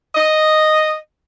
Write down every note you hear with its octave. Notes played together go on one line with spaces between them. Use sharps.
D#5